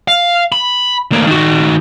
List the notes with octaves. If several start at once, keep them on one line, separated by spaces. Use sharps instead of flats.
F5
B5
D2 A#3
D#3 F#4